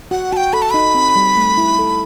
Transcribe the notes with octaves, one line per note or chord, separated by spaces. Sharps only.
F#4 F#5
F#4 G5 A5
A4 B5
A5
D#4 B5
C4
G3
A3
E4
A4